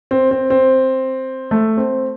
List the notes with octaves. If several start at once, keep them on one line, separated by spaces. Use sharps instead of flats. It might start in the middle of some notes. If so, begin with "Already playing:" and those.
C4
C4
C4
A3
C4